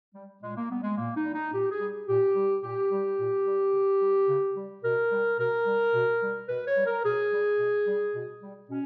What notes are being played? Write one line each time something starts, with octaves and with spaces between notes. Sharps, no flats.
G3
A#2 G#3
A#3
G3 B3
G#3
A#2 A#3
D#4
G3
D#4
A#2 G4
G#4
G3
A#2 G4
G3
A#2 G4
G3
A#2
G3
C#3
G3
C#3
G3
B2 A#4
G3
B2 A#4
G3
B2
G3
B2 B4
C#5
G3
A#4
B2 G#4
G3
B2
G3
B2
G3
B2 C#4